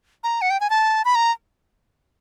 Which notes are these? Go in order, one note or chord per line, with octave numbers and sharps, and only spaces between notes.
A#5
F#5
G5
G#5
A5
B5
A#5